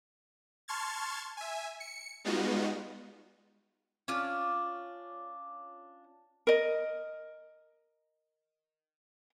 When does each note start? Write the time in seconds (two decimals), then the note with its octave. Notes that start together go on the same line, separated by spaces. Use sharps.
0.68 A5 C6 C#6 F6 G#6 A6
1.37 E5 G#5
1.80 C#7
2.24 G3 G#3 B3 D#4 F4 F#4
4.08 C#4 D4 F4 D5
6.47 A#4 D#5